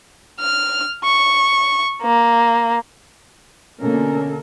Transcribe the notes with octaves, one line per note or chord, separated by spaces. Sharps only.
F6
C#6
A#3
B2 D3 A#3 C#4 A4 A#4